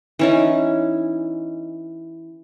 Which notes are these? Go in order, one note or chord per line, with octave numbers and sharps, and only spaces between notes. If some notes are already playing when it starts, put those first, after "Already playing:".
E3 C#4 D#4